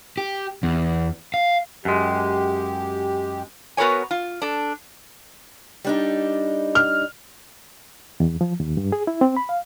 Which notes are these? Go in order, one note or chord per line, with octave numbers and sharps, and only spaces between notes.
G4
E2
F5
F#2 G#3 G4
B3 F#4 A#4 B4 C#5 G#5
F4
D4 A4
G3 D4 D#4
F6
E2
F3
D#2
G2
G#4
E4
C4
B5
F5